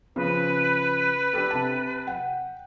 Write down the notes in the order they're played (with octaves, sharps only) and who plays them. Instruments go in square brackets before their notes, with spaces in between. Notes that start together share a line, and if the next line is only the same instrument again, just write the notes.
[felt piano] C#3 F3 [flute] B4
[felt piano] D4 G4 A4
C3 A5
F#5 G5